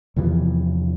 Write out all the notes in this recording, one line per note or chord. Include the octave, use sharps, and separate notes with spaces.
E2 C3 E3 F3